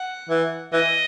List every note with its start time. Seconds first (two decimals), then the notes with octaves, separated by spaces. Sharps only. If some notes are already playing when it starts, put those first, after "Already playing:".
Already playing: F#5
0.29 E3
0.73 E3 D#5